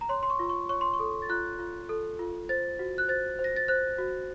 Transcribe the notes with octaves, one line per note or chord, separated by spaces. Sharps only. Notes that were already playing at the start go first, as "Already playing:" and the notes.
A#5
C#5 C6
C6
C#6
F4
C#6
C#5 C#6
C6
C#6
A4
A6
F4 F#6
F4
A4
F4
C5 A6
F#4
F#6
C5 A6
C5
A#6
A6
C5 F#6
F#4